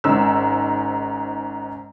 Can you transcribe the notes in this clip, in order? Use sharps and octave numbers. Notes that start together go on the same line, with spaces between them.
G#1 G#2 C#3 E6